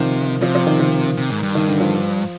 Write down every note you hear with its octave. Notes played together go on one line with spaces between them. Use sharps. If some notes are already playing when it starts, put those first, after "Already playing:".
Already playing: C3 D#3 F3
C3 F3
F3
D#3
D#3
C3
G#2
G2
D#3
D3
F3